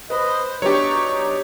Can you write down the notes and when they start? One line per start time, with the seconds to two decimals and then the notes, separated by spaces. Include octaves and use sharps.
0.10 B4 C5 D#5 B5
0.62 F#3 B3 D4 D#4 G4 C#5 C#6